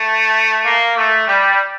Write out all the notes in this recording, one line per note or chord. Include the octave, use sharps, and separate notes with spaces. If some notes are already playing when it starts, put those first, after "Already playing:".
Already playing: A3
A#3
A3
G3